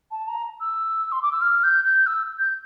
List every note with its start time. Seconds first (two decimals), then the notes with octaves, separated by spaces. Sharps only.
0.11 A5
0.28 A#5
0.60 E6
1.12 C6
1.22 D6
1.32 E6
1.41 F6
1.63 G6
1.84 G6
2.06 E6
2.39 G6